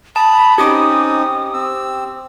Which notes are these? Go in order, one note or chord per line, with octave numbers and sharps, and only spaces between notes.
A5 B5 D#6
C4 C#4 D#4 G4 D6 D#6
C4 E6